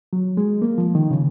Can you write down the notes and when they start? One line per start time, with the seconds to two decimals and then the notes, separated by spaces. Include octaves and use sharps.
0.13 F#3
0.37 G#3
0.62 A#3
0.78 F3
0.95 D#3
1.11 C#3